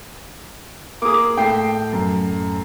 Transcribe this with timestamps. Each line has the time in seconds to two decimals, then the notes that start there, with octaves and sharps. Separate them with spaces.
1.02 A#3 G#4 D6 D#6
1.37 A2 G5 C7
1.93 F#2